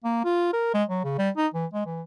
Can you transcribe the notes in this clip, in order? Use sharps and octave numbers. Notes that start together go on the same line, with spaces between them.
A#3
F4
A#4
G#3
F#3
C#3
G3
D#4
E3
G#3
E3